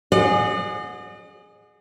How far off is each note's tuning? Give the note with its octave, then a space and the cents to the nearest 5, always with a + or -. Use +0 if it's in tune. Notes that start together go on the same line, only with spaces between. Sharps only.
G#4 +0 D#5 -45 F#5 -10